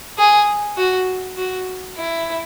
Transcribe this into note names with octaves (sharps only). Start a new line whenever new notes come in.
G#4
F#4
F#4
E4